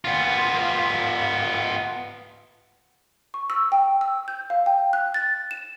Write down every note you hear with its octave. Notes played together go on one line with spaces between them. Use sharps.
B3 F4
C#6
E6
G5
E6
G6
F5
G5
F#6
A6
E7